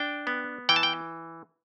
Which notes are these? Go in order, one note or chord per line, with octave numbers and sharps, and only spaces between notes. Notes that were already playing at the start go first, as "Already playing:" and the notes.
Already playing: D4 G5
B3
E3 G5
A5
G5